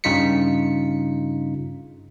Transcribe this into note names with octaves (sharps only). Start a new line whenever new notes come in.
G2 C#3 D#4 F4 B6 C#7